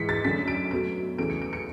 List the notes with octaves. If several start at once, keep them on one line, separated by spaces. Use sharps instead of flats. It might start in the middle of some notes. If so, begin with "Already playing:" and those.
Already playing: G#2 E3 G#3 B6 C#7
A6
F#2 D3 A3 B6
D7
B2 F#3 A3 D7
E2 C#3 E3 A3 D7
C#7
D7
C#7